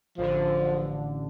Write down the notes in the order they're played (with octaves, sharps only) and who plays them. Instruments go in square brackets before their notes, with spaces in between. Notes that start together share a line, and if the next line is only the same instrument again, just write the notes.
[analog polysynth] A1 D3 [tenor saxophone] F3